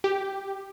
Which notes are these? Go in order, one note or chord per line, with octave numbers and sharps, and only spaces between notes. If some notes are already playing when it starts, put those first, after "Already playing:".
G4